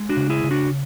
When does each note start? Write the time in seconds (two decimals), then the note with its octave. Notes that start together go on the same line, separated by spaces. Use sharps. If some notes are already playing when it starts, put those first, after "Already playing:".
Already playing: G#3
0.09 D4 F#4
0.17 C#3
0.30 E4 G#4
0.44 C#3
0.51 D4 F#4